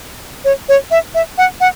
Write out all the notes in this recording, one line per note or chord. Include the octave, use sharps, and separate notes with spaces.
C#5
C#5
E5
E5
F#5
F#5